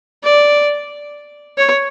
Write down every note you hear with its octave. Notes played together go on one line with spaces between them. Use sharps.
D5
C#5